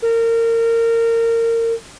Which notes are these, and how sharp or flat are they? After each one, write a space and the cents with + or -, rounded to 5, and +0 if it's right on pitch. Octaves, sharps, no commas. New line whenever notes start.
A#4 -25